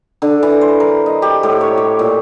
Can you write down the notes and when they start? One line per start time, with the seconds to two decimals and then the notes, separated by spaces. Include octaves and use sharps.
0.22 D3
0.43 E3
0.61 C5
0.80 A#4
1.06 D#5
1.22 G4
1.43 A2
1.61 C#5
1.78 G4
1.99 A#2